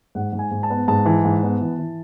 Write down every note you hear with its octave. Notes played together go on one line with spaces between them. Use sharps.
G#2 F#5
G#2
G#5
G#2
A5
B3
G#2 A5
E3
G#2
B3
E3
E3